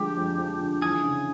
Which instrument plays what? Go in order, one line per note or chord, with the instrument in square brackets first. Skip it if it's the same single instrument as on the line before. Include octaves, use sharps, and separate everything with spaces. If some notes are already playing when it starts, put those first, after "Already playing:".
Already playing: [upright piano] D3 F3 G#3 [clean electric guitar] G4
[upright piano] F2
F3
D3
[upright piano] E3 [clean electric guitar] G#4
[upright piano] C#3